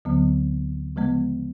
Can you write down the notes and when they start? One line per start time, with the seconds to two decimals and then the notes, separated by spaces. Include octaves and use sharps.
0.05 D2 D3 F#3 B3
0.96 C#3 F3 G#3 B3